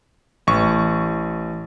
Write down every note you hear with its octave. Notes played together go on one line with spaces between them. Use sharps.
A1 C#6